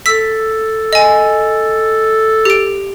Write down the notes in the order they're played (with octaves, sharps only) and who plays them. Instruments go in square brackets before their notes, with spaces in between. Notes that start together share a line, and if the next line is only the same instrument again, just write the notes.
[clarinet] A4 [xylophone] E6 B6
[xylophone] D#5 G#5
G4 D7